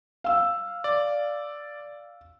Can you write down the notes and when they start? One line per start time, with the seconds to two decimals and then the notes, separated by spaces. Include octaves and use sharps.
0.24 F5 E6
0.84 D5